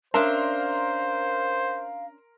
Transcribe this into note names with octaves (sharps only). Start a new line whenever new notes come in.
C#4 D4 A#4 C5 E5 F5 C6